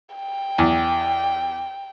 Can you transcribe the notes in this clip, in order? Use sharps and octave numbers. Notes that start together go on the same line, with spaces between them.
G5
E2